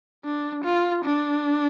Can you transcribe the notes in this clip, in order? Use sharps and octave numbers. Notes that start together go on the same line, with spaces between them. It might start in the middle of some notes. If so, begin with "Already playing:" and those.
D4
F4
D4